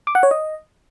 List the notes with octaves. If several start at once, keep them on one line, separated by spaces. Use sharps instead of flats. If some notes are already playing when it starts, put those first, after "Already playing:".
D6
F#5
C#5
D#5